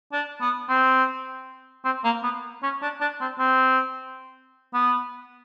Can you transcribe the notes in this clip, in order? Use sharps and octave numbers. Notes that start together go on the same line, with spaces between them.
D4
B3
C4
C4
A#3
B3
C#4
D4
D4
C4
C4
B3